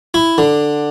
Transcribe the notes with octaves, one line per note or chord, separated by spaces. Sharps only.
E4
D3